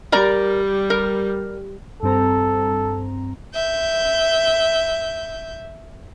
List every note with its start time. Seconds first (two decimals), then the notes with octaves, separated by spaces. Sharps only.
0.12 G3 A#4 D5 A#5
0.90 A#4
2.03 G2 C4 A4 A#5
3.54 E5 G6